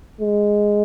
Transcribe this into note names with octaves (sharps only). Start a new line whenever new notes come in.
G#3